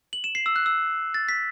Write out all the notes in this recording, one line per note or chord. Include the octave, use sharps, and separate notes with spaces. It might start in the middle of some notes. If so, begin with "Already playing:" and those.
F#7
E7
C7
E6
F#6
E6
A6
B6